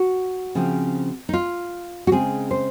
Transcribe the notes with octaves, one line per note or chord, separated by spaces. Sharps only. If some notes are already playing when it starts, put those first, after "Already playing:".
Already playing: F#4
C#3 F3 C4
D#4
F4
F#4
C#3 G#3 C4 G#4
C5